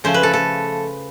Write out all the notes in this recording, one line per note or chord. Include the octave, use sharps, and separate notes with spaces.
C#3 F3 A3 C5
B4
A4
A4